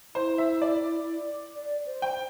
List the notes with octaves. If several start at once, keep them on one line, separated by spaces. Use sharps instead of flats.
E4 C5
E5
D5
D5
C5
G5